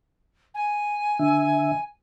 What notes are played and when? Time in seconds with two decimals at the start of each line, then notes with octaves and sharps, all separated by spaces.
0.55 G#5
1.19 D3 E5